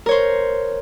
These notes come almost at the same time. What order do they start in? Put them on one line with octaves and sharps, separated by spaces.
A#4 C#5 C5